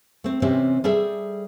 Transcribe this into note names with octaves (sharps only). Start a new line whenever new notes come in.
A3 C4
C3 E3 C4 C#4 G4
G3 G#4 A4 C5 E5